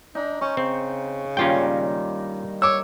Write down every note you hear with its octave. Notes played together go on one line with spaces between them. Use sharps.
D4 D#4
C#4 C#6
C#3 C4
G2 D#3 A#3 C#4 F4 G5
C#5 D6 E6